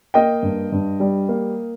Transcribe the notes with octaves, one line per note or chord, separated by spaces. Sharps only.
A#3 D#5 G5
G2
G2
G3
A#3